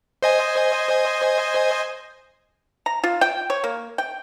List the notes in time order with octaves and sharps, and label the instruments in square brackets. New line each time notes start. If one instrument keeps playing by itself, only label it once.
[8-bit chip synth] C5 D#5 G#5
[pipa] A#5
F4
G5
C#5
A#3
G5